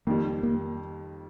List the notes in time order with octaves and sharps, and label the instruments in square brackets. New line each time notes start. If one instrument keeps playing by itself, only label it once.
[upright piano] F2 D#3 G3 [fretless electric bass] A#3
[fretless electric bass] A#3